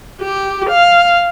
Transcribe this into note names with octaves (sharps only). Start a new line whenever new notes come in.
G4
F5